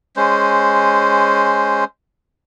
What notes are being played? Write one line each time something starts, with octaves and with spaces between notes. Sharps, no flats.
G#3 C#4 C5